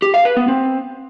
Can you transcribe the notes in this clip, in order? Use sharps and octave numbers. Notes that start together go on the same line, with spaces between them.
G4
F5
B4
B3
C4